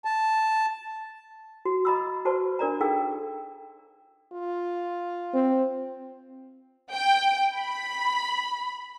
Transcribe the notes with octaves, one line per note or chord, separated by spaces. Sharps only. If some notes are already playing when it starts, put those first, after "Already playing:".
A5
F#4
D#5 A#5 B5 D#6 E6
F#4 B4 C5 D5 A5 C#6
D4 A#4 D5 A#5
D#4 G#4 A4 F5 G5 E6
F4
C4
G5
B5